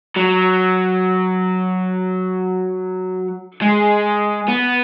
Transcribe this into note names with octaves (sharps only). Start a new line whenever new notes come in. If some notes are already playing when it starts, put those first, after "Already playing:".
F#3
G#3
B3